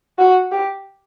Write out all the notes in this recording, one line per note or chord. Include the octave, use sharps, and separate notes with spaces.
F#4
G4